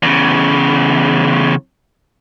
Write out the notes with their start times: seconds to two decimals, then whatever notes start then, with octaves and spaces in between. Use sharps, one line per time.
0.03 E2 C#3